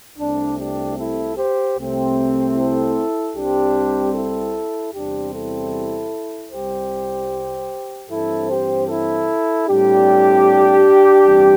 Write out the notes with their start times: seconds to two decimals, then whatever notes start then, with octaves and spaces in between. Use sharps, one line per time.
0.18 C2 C3 A3 C4 D4
0.58 D4 G4
0.97 E4 A4
1.37 G4 C5
1.77 C2 C3 A3 C4
2.56 E4 A4
3.35 C2 C3 G3 C4 D4 G4
4.14 E4 A4
4.93 E2 C3 G3 C4 D4 G4
5.33 E4 A4
6.51 C2 C3 G3 G4 C5
8.09 G2 E3 C4 E4 A4
8.48 G4 C5
8.88 E4 A4
9.68 A2 G3 C4 D4 G4
11.26 A1 G2 E3 G3 C4